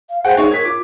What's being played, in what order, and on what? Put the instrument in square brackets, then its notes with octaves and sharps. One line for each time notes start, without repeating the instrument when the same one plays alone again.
[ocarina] F5
[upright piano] G#4 F#5 G5 [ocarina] C5
[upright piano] G#3 C#5 [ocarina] D#4
[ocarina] A#4 [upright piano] G#6 B6
[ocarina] F4 [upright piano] D6